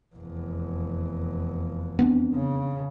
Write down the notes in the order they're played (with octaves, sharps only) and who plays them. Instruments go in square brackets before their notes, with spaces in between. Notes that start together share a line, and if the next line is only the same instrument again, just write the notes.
[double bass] F1 E2
[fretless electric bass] B3 C4 D4
[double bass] C#3